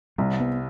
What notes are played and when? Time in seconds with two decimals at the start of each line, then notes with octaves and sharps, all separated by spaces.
0.18 C2 G3
0.40 B3